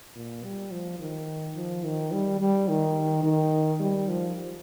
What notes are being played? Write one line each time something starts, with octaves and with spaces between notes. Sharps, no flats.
A#2
G3
F3
D#3
F3
D#3
G3
G3
D#3
D#3
G3
F3